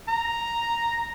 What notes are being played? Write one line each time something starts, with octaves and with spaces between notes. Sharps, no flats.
A#5